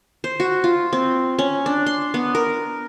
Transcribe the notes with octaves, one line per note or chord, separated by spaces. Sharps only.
C5
F#4
F4
C4
C#4
D4
C6
B3
A#4